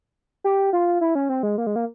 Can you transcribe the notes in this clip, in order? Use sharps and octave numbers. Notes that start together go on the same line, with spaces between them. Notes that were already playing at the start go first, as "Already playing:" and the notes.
G4
F4
E4
C#4
C4
G#3
A#3
G#3
A#3